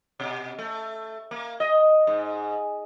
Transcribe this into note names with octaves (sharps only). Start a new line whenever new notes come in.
B2
A3
A#3
D#5
G#2